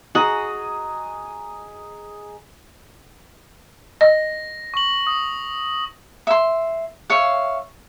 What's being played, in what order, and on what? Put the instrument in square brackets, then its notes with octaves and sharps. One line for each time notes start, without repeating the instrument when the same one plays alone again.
[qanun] F#4 [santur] G#4 D#5 A#5
[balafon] D#5 [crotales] A#6
[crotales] C#6 F#7
D#6
[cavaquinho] E5 C6
C#5 E5 F5